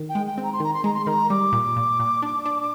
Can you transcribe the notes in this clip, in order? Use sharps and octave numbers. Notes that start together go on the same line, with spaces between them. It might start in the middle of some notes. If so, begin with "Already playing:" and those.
Already playing: D#3
G5
G#3
G5
C4
A#5
C6
D#3 A#5
C6
G#3 A#5
C6
D#3 A#5 C6
G3 D6
A#2
A#2
A#2
D4
D4